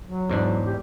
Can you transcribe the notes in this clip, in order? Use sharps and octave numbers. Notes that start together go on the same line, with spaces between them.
F#3
E2 G#2 D4
G4